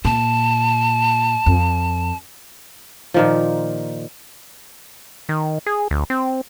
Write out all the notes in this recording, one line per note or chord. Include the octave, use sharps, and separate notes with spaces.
A#2 A5
F2
A#2 D#3 F3
D#3
G#4
D2
C4